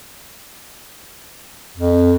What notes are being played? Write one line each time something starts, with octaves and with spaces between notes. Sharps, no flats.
F2